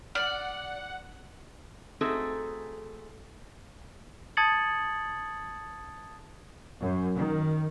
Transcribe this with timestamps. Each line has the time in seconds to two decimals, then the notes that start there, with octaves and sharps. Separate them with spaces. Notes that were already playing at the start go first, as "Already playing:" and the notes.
0.15 D5 F#5 F6
2.01 A3 C4 D#4 F#4 G#4 A4
4.37 A5 D#6 G#6 A6 C#7 F#7
6.81 F#2
7.17 D#3